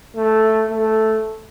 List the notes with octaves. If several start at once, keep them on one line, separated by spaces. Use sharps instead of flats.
A3
A3